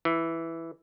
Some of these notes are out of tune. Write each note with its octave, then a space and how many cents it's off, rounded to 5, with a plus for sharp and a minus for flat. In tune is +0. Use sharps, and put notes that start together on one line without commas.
E3 +0